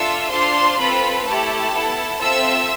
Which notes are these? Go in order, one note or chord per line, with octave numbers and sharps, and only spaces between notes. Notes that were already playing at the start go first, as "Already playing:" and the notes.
Already playing: D4 F4 A4 E5 E6
D4 F4 A4 C5 C6
C4 F4 A4 B4 B5
A3 E4 G4 A4 A5
B3 E4 A4
C4 F4 A4 E5 E6